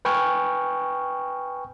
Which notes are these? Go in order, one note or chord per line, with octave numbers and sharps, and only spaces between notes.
B4 G5 G#5 C#6 F6